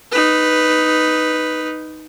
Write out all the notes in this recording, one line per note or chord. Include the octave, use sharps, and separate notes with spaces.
D#4 B4